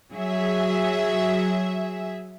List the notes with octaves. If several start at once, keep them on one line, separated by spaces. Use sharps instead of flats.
F#3 G#4 E5